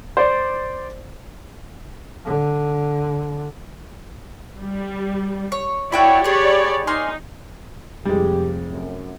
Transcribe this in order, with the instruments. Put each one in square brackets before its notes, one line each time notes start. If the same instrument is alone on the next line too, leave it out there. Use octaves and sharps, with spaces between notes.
[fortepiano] C5 D5
[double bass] D3
[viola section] G3
[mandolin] C#5
[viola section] E4 C#5 D5 [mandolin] F#4 G5 B5
[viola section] G4 C#5 D5 [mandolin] G#4 B4
[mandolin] A#3 G#5 C6 [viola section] D#4
[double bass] F1 F2 [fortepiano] G3 G#3 [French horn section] G4
[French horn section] F#2